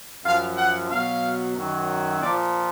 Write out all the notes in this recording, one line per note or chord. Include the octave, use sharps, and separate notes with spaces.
F#2 F3 F5
F#5
B2 F#3 F5
F#2 D#3 F#3
A#2 F3 D5